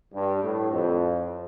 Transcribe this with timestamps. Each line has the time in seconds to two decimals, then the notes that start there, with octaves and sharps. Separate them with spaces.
0.14 G2
0.43 A2
0.72 F2